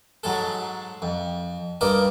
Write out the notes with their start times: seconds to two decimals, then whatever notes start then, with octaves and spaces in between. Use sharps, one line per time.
0.23 G#2 F#3 G#3 A4
1.02 F2
1.81 G2 A#3 A#4 D5 D#5 A#5